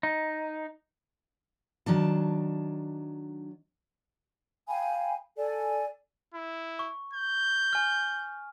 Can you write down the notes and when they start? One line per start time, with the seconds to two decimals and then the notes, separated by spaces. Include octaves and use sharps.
0.03 D#4
1.86 D#3 F#3 D4 A5
4.68 F5 G5 G#5 B5
5.37 A4 D5 G#5
6.34 E4
6.79 C#6
7.13 G6
7.73 G#5 F6